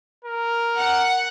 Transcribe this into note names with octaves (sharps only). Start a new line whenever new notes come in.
A#4
F#5